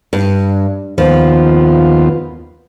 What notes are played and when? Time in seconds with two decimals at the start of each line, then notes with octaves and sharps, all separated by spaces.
0.13 G2
0.98 D#2 F3 B3 F4